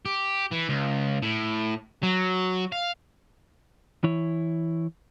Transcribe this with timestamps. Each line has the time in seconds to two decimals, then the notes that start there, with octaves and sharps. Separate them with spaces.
0.06 G4
0.52 E3
0.69 C#2
1.22 A2
2.03 F#3
2.72 F5
4.04 E3 E4 C#5